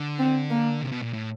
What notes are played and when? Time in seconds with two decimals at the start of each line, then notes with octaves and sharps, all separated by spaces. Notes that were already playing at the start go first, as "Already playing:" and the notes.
Already playing: D3
0.19 C4
0.50 A#3
0.82 C3
0.92 B2
1.02 A#2
1.13 A2